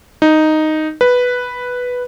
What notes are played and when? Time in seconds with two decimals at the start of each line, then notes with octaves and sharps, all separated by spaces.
0.22 D#4
1.01 B4